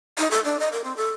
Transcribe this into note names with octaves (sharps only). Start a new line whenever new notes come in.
D#4
A4
D4
D#5
A#4
C4
A4